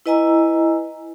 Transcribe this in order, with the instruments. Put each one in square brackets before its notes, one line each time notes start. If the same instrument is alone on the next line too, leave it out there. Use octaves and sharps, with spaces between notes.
[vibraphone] E4 B4 D#5 G#5 A#5 E6